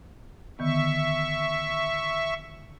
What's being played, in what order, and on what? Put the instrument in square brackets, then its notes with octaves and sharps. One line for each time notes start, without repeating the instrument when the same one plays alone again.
[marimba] D3 D#3 B3 [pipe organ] E5 C#6